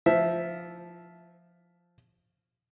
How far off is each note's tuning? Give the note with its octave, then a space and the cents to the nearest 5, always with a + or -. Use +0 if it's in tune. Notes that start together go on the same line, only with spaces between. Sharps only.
F3 +0 E5 +0